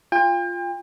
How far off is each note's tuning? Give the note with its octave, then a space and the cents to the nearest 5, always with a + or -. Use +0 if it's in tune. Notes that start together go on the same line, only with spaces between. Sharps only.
F4 +0 G5 +40